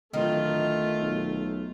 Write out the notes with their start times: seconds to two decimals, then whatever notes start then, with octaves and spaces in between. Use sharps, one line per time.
0.14 D1 D#3 A3 F4
1.00 B1